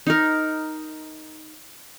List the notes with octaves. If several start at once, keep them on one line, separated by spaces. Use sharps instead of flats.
D#4 A#4